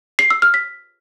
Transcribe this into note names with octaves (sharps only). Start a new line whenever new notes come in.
C7
E6
F6
B6